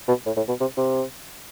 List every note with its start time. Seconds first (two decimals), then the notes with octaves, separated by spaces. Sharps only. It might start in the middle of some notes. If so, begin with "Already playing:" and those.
0.08 B2
0.26 A2
0.37 A2
0.48 B2
0.60 C3
0.77 C3